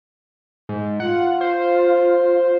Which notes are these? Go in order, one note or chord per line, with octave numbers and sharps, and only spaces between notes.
G#2
F4 F#5
C5